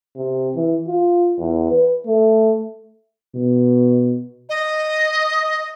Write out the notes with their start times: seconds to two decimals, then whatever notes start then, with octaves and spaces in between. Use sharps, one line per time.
0.16 C3
0.55 E3
0.87 F4
1.39 E2
1.71 B4
2.07 A3
3.35 B2
4.50 D#5